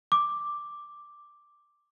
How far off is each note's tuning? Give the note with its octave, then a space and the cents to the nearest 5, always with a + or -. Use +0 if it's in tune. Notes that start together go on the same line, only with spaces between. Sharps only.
D6 +0